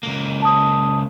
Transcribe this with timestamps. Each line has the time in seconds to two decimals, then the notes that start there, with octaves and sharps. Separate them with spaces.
0.03 C#2 A#3
0.42 A5 D#6